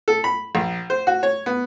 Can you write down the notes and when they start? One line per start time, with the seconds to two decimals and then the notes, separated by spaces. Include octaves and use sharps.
0.08 A4
0.24 B5
0.55 A#1
0.90 C5
1.07 F#4
1.23 C#5
1.46 B3